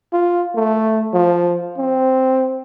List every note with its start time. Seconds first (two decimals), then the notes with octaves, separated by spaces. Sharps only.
0.13 F4
0.55 A3
1.14 F3
1.78 C4